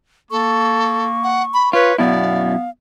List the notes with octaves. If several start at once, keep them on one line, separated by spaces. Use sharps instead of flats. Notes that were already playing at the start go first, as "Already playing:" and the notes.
A#3 A4 C#6
F#5
B5
F4 B4 C#5
F#2 B2 B3 E4 D5 F5